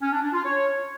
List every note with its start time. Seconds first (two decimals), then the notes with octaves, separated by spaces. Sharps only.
0.02 C#4
0.12 D4
0.23 D4
0.33 F4
0.44 C#5